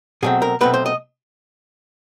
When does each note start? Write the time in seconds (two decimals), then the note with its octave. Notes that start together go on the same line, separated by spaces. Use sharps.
0.22 B2 F#3 A3 C4 G#4
0.42 A#4
0.61 B2 F#3 A3 C4 B4
0.74 C5
0.86 D#5